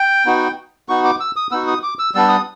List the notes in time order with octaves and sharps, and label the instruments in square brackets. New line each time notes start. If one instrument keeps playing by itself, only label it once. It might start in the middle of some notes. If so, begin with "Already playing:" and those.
Already playing: [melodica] G5
B3 D#4 F#4
B3 D#4 F#4 C#6
D6
E6
D#6
B3 D#4 F#4 E6
D#6
D6
E6
G3 B3 D4 E6
D#6